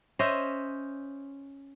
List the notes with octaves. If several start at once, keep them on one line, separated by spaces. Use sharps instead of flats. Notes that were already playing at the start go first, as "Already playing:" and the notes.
C#4 C5 D#5 E5